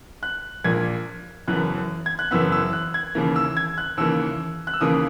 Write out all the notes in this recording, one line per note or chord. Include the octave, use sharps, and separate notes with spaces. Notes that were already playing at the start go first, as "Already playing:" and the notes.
F#6
A#1 A#2 A#3 G#6
F#1 F#2 E3 B3 F#6
G#6
F#6
F#1 F#2 E3 B3 E6
E6
F#6
G#6
D#2 C#3 E3 A#3
E6
G#6
F#6
D#2 C#3 E3 A#3 E6
F#6
E6
D#2 C#3 E3 A#3 D#6